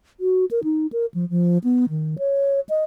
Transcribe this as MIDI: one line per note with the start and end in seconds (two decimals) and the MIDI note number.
0.20 0.45 66
0.51 0.60 70
0.64 0.87 63
0.93 1.06 70
1.14 1.28 53
1.30 1.58 53
1.64 1.89 59
1.89 2.15 51
2.19 2.60 73
2.69 2.84 75